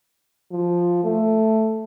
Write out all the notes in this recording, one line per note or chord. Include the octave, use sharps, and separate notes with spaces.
F3
A3